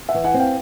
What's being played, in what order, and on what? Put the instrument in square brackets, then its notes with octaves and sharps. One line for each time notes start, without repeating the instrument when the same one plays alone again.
[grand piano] E5 F#5
[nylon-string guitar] E3
[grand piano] F#5 G#5
[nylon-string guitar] C4
[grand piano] F5 G5